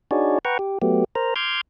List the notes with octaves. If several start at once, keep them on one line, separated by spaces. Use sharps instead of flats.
D4 D#4 F#4 G#4 C#5 D5
B4 F#5 G5 A#5 C#6
G4
F#3 A3 B3 G4
A#4 C5 A#5
C6 D6 F6 G6 G#6